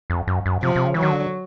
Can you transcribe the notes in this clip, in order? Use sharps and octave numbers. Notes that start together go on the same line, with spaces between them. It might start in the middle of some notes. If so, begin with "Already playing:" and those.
F2
F#2
F#2
C3 F3
C3
C#3
E3
D#3 F#3
D3